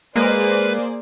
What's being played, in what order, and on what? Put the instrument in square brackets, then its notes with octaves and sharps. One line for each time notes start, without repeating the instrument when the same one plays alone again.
[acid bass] G#3 [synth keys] A#3 [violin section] G#4 C5 D5 [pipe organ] B4